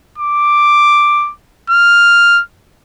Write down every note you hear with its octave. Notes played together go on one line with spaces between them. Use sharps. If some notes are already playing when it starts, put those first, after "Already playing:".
D6
F6